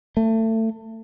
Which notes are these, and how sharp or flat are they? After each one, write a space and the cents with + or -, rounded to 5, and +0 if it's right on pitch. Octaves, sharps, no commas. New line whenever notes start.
A3 +25